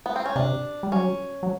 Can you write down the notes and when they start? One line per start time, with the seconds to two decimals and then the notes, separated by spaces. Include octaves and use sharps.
0.06 B3
0.16 C4
0.26 C#4
0.36 C3 D4
0.83 G3
0.92 F#3 C#4
1.43 F#3